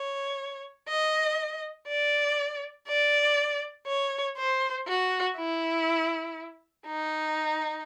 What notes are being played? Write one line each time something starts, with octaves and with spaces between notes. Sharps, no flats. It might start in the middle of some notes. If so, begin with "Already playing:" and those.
Already playing: C#5
D#5
D5
D5
C#5
C5
F#4
E4
D#4